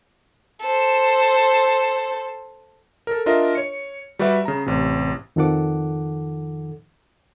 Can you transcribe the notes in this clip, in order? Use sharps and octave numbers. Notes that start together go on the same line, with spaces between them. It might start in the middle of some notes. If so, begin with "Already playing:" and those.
A4 C5
A4 A#4
D4 F4 A#4 D#5 E5
C#5 C#7
G3 F#4 G4 B4 E5
C#3 A#5
A1 C3
F2 D#3 F3 A4 F#5 D6